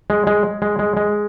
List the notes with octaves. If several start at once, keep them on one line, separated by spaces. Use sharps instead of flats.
G#3
G#3
G#3
G#3
G#3